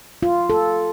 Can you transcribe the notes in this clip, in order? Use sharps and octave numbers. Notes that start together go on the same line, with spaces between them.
F4
A4